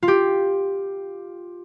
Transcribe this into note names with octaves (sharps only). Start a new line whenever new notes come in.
F4
G4